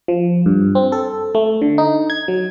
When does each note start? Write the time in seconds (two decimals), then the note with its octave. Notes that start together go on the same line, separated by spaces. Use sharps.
0.08 F3
0.46 G2
0.75 C4
0.92 A4
1.35 A3
1.62 D3
1.78 D#4
2.10 G#6
2.28 F#3